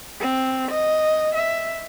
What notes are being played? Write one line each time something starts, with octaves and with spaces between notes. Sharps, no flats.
C4
D#5
E5